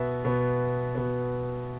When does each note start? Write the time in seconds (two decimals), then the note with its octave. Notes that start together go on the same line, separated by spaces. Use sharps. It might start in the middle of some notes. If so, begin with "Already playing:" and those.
Already playing: B2 B3 E5
0.25 B2 B3
0.95 B2 B3